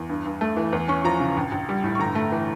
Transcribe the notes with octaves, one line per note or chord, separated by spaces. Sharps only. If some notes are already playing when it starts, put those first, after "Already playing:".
Already playing: E2
G2
G2
A3
E3
E2
C#4 C#6
F3 A#5
C#3
A#1
A#1
G3
A2
C#6
G1 A#5
A3
E3